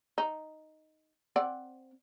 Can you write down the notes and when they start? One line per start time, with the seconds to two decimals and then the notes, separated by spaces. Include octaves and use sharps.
0.18 D#4
1.36 C4 D5 F#5